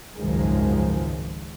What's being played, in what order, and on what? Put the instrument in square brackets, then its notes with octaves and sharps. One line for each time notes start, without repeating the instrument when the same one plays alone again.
[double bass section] G#1 C#2 F#2 D#3 F3 G#3